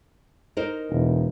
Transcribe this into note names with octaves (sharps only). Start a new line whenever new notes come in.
D#4 A#4 C5
E1